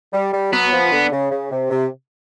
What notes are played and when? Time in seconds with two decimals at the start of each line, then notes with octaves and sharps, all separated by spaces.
0.13 G3
0.33 G3
0.52 F#3 B3
0.73 F3
0.91 D3
1.11 C#3
1.31 C#3
1.51 C3
1.71 C3